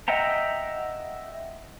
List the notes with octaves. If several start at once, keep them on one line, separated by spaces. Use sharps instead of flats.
D#5 E5 F#5 G5 A#5